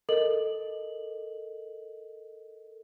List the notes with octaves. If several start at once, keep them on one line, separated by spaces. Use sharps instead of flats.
A4 A#4 D#5 F#7